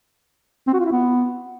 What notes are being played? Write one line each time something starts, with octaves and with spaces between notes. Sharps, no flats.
C4
F#4
F4
E4
B3